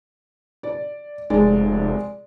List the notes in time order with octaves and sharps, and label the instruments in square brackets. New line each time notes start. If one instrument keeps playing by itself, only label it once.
[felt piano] D5
[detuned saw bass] F1 [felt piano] G#3 D5